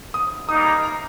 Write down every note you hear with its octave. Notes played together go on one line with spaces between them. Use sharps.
D#6
G3 A#3 D#4 D#6
A#5
A#5